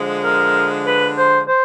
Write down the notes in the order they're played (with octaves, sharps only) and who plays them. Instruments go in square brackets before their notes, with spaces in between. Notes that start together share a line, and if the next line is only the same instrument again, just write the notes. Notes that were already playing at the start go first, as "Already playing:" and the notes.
Already playing: [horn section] D3 F3 G#3
[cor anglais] A#4
B4
C5
C5